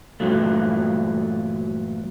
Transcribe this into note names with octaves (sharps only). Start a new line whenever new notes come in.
G2 A#2 E3 F#3 A3